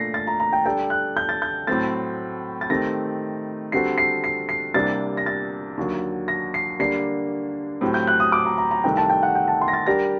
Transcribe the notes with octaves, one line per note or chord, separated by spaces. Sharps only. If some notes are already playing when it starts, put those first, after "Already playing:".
Already playing: A#2 A3 D4 A#6 C7
A6
A#5
A#5
G5
G3 D4 A4 G5
F#6
G6
A6
G6
A2 F#3 A3 C4 A6
A6
D#3 A3 C4 G4 A#6
D3 G3 C4 F#4 A4 C7
C7
C7
C7
C2 C3 G3 A#3 D4 A6
A#6
A6
D#2 D3 F#3
A#6
C7
D3 G3 A#3 D4 C7
A2 F#3 C4 G4
G6
F#6
D#6
D6
A#5
A#5
A#5
C2 C3 D#3 A3 G5
A5
G5
F#5
G5
A5
C6
A#6
A6
G3 D4 G4 A#4 A#6